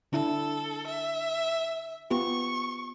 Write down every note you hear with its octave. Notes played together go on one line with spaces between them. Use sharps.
D3 D4 E4 A4
E5
B3 F4 G4 C#6